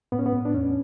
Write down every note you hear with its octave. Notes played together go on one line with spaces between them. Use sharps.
A2 B3
C#4
B3
A2
D4
E2 C#4